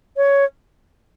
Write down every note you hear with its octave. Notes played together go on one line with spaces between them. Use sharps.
C#5